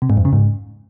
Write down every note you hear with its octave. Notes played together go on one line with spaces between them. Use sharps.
C3
G#2
F2
C#3
G#2